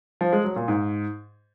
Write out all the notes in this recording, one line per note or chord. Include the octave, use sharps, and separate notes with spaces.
F3
G#3
F#3
A#2
G#2